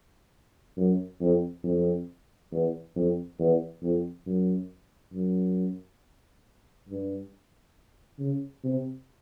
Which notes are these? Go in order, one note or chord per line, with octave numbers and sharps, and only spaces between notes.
F#2
F2
F2
E2
F2
E2
F2
F#2
F#2
G2
C#3
C3